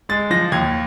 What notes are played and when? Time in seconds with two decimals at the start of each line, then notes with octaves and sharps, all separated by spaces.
0.09 G#3 A6
0.30 F3 A#6
0.52 D#2 G#6